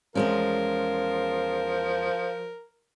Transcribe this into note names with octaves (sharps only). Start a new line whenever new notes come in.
E2 F3 G#3 C#4 A#4